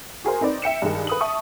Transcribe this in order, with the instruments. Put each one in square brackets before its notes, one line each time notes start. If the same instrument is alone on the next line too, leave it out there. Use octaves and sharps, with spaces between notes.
[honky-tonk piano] F#4 G#4 A#4 C5
C4 D#4 B4 D5
E5 G5 C#7 E7
G2 D#3 G#3 D#4
B4 D#6 F#7
E5 A5 C#6 D#6